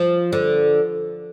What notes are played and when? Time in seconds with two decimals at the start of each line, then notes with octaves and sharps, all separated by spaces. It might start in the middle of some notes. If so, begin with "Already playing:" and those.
Already playing: F3
0.32 D3